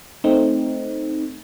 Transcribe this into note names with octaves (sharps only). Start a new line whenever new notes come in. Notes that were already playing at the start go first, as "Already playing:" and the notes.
A3 C4 D#4